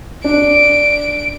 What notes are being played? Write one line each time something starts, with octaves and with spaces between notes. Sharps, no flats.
D4 D7